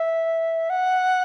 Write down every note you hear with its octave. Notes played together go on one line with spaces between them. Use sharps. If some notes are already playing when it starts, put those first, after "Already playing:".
Already playing: E5
F#5